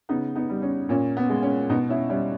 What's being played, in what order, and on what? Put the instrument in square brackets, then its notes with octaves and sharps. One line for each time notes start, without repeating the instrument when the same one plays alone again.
[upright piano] C#3 B3 D#4
B3 D#4
G3
C#4
A#2 C#4
B3
G#3
C#4
B2 B3 D#4
C#4 E4
G3 C#4 E4